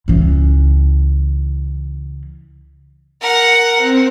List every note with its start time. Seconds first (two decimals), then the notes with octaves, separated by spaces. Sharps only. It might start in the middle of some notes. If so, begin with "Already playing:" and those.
0.08 C#2 E3
3.21 A#4 F#5
3.76 C4